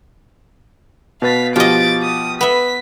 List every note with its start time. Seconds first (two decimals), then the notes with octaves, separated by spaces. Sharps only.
1.22 B2 B4 F5 A6 B6
1.56 B2 F3 F4 G4 D#5 A6 D7
2.02 D#6
2.41 B3 E5 B6